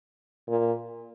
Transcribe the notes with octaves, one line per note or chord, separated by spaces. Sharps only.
A#2